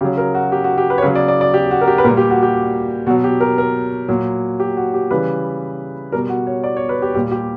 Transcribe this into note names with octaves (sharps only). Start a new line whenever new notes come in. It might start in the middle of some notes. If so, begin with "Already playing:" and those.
C#3 F#3 G4
A#4
F#4
G4
F#4
G4
B4
C#5
C#3 F#3 B4
D5
D5
D5
G4
F#4
A#4
G4
B4
A#2 G3 A#4
G4
F#4
G4
B2 F#3 F#4
G4
A#4
A#4
A#2 F#3
G4
F#4
G4
C#3 E3 G3 B4
B2 G3 A#4
F#4
C#5
D5
C#5
B4
G4
A#2 G3 G4
G4